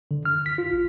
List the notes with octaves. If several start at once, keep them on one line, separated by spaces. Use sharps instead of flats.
D3
F6
B6
F4
A1